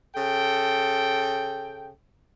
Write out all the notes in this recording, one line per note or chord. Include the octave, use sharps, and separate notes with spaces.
C#3 A4 G5